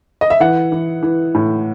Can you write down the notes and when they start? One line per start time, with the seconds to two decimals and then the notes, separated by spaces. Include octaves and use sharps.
0.21 D#5
0.30 E5
0.40 E3 F#5
0.72 E3
1.03 E3
1.35 A2